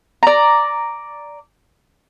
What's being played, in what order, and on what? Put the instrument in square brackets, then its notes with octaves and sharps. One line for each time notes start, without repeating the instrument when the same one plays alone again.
[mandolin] D5 A#5